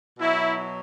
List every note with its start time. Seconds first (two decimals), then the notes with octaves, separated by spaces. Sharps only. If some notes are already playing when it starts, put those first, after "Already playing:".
0.19 B2 F#3 E4